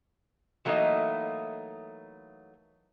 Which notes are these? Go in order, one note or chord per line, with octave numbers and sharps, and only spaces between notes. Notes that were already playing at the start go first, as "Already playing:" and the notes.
E3 F#3 A3 A#3 D#4 D#5